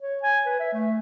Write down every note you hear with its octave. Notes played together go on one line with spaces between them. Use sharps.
C#5
G#5
B4
E5
A3